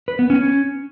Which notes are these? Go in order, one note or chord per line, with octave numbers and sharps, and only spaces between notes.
B4
B3
C#4